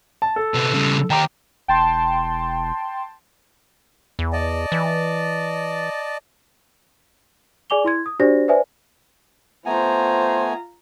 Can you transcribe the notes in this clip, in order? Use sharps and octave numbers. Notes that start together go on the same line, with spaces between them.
A5
A4
C3 B3
C#3 G3
D#3 G4 G5 A#5 D6
E1 G5 A5 C6
E2
D5 D#5 A5
E3
G#4 D5 G#5 D6 F7 G7
E4 C6 G#6
D#6
D4 F#4 G4 C5 D5 A#6
B4 C5 D5 E5 G#5
A3 B3 F4 C5 G#5 A#5